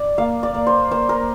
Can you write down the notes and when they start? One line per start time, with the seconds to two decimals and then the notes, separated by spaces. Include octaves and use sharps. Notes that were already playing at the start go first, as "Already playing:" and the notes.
Already playing: D5
0.18 A#3 F5
0.43 D5
0.54 A#3
0.67 C5
0.91 A#3 C5
1.09 A#4